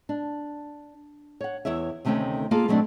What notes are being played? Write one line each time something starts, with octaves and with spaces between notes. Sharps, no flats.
D4
C#5 F#5
E2 E4 C#5 E5
D2 C3 D#3 A3 C#4 G5
A#3 F4 G#4 A4
B2 F#3 G3 A3 C4 D4